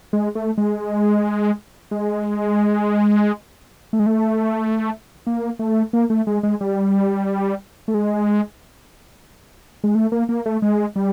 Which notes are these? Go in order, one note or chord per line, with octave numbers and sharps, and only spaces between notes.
G#3
A3
G#3
G#3
A3
G#3
A3
A#3
A3
A#3
A3
G#3
G#3
G3
A3
G#3
G#3
A3
A#3
A#3
A3
G#3
G3